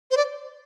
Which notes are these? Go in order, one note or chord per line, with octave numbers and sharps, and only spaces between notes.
C5
D5